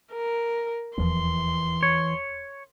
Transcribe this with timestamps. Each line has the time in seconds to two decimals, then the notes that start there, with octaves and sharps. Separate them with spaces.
0.12 A#4
0.98 D#1 E2 E3 F3 C6
1.83 C#5